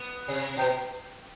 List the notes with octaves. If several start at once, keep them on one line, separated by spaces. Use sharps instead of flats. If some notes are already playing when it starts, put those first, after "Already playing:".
Already playing: B3
C3
B2